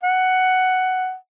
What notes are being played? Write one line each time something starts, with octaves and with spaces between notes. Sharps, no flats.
F#5